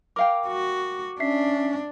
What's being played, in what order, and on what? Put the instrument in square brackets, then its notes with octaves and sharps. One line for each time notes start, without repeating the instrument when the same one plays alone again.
[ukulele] A#4 F5 G5 [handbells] D6
[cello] F#4
[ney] C#4 [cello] D4 [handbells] E5 B6 C7